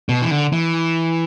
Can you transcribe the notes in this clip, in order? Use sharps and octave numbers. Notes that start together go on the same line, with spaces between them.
B2
E3
D3
E3